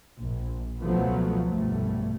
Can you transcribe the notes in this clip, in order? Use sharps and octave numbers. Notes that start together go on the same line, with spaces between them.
A#1
C#2 B2 F3 F#3 A3 B3
A#1 G2 B2 A3